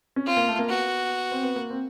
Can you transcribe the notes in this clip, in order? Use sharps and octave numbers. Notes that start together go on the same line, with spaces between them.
C#4
C4 F4
A#3
A3
A#3
B3 F#4
C4
B3
A#3
C4